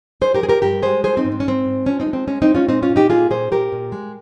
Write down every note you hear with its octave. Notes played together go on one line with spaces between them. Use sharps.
F3 G#4 C5
G4 A#4
F3 G#4
G4 A#4
G2 G4 A#4
G#3 G#4 C5
F3 G#4 C5
C4 D#4
G#2
C4
C#4
G#2 C4
G#2
F3 C#4
C4 D#4
G#3
C4
G#3 C#4
C4 D#4
G#3
C#4 F4
A#2 C4 D#4
C#4 F4
A#2
D#4 G4
A#3 F4 G#4
A#2 G#4 C5
A#2 G4 A#4
A#2
G#3